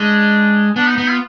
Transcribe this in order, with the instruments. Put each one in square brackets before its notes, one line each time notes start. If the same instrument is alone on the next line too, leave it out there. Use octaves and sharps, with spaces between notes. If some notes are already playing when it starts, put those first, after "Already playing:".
Already playing: [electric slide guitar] G#3 [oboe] D4
[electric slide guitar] B3 [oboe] D4
[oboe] D#4
[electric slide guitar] B3 [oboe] D#4
[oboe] F4